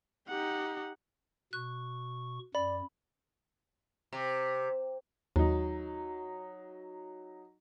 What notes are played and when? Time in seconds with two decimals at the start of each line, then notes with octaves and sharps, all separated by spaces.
0.28 D#4 G4 F#5
1.53 B2 C#6 F#6
2.55 F#2 D5 B5
4.13 C3
5.36 D#2 F#3 D#4